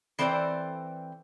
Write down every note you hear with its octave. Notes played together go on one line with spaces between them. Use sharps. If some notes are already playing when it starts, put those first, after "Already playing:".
E3 C4 A4 C5 D5 G5